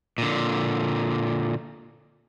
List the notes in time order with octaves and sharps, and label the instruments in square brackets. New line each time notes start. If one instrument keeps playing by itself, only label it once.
[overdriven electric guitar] A#2 D3